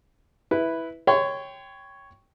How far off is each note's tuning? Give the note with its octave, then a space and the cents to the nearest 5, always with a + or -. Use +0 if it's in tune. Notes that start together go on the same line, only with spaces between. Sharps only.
E4 -5 B4 +0
C#5 +0 G5 +0 C6 -35